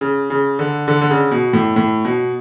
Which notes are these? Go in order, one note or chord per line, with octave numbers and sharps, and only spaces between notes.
C#3
C#3
D3
D3
D3
C#3
B2
A2
A2
B2